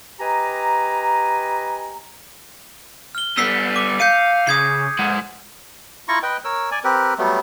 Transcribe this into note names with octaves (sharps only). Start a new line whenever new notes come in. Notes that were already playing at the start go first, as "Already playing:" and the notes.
G4 B4 D#5 G#5 A#5
F6 G7
G3 B3 E6 B6 C7
D6
F5 G6 C#7 D#7
C#3 D#6 G#6 C7
G#3 F#5
E4 F4 A#5 C#6
B4 D#5 G5
A#4 C#5 E6
D5 G#5
C4 G4 A#4 B4
F#3 G3 A3 B3